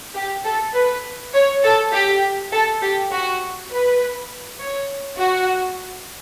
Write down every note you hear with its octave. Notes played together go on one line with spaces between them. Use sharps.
G4
A4
B4
C#5
A4
G4
A4
G4
F#4
B4
C#5
F#4